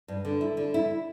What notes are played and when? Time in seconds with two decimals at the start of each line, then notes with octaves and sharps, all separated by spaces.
0.08 G2
0.25 D3
0.41 E4
0.57 D3
0.74 E4